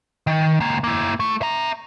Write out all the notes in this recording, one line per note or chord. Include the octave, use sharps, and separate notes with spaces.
D#3
C#2 A#3
A#3 E4
A3
E5 A#5